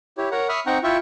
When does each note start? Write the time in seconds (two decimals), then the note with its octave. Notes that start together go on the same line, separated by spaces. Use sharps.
0.18 E4 G4 C#5
0.32 A#4 C#5 F#5 A#5
0.49 E5 B5 C#6 D#6 F6
0.66 C4 D#4 F#5 G5 A#5 C#6
0.83 E4 F4 E5 G5 C#6